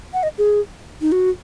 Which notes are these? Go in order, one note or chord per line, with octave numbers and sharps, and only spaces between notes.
F#5
D#5
G#4
D#4
F#4